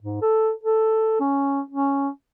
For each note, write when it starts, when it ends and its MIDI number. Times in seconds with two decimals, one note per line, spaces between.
0.02 0.20 44
0.22 0.51 69
0.63 1.17 69
1.20 1.61 61
1.70 2.09 61